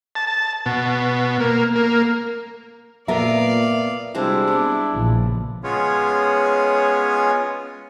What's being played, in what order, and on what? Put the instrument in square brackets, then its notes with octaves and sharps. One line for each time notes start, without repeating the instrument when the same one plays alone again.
[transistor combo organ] A5
A5
B2
A#3
A#3
[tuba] A#2 [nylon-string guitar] B3 A4 A#4 [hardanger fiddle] D5 F5 [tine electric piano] E5
[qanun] C3 G#3 [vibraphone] G3 C4 F#4 [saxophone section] D4 E4
[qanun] B3 [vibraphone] A5 D6
[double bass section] A#1 C#3 F3
[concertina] G#3 B3 C#4 F4 G#4 C#5